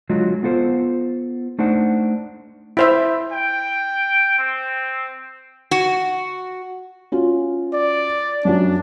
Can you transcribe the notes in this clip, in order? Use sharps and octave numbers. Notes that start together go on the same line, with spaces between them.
D3 F#3 G#3 F4 D#5
B3 F4 A4 C5
A3 D4 D#4 C5 F#5
E4 C5 E5
G5
C4
F#4
C#4 F4 F#4
D5
F#2 F#3 D4 F#4